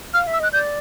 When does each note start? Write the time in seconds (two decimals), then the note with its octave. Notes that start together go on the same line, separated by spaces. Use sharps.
0.14 F5 F6
0.27 E5
0.33 E6
0.40 D#5 F#6
0.53 D5 G6